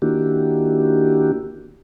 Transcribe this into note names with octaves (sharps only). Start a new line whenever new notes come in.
D#3 A#3 D4 E4 F#4 G4